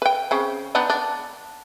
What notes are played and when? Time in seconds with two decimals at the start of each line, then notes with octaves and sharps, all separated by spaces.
0.02 B4 G5
0.31 C#3 C4
0.75 B3 D4 D#4
0.90 D4